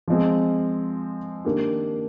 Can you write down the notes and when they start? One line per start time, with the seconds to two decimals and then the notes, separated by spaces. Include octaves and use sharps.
0.08 F3 G#3 C4
1.45 D#3 A#3 D4 G4